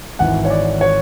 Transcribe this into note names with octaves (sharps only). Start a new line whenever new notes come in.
G#1 G#2 E3 F#5
C#5
D5
C#5